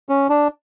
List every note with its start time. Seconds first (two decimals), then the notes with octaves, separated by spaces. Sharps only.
0.09 C#4
0.29 D4